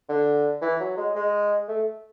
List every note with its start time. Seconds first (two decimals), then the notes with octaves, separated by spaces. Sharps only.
0.09 D3
0.62 E3
0.80 F#3
0.97 G#3
1.15 G#3
1.69 A3